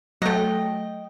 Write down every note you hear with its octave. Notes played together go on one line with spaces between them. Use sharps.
F#3 A3 D#5 G5